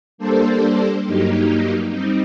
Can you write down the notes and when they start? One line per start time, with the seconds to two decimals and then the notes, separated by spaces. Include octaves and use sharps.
0.18 G3 A#3 D4 A4 C5
1.02 G2 F#3 A#3 D#4 G4
1.87 G3 C4 D#4